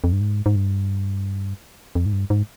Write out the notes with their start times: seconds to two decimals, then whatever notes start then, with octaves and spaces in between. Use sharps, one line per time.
0.04 F2
0.12 G2
0.21 G#2
0.46 G#2
0.56 G2
1.95 F2
2.06 G#2
2.13 G2
2.30 G#2